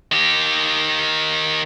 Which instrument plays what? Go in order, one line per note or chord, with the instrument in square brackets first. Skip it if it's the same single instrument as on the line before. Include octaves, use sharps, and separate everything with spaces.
[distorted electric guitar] D#3 G4